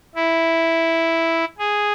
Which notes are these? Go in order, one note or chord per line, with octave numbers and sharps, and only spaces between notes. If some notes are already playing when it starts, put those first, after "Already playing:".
E4
G#4